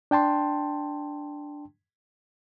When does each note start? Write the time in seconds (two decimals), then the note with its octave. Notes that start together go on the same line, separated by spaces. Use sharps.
0.11 D4 G5 A5 C6